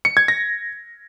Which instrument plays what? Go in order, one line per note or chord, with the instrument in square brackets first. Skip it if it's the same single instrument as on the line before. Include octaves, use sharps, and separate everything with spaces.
[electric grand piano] C#7
G#6
A#6